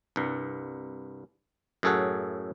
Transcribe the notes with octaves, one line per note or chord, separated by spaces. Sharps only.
C2 G2
F#2 A2 G#4 A4 C#5 F#5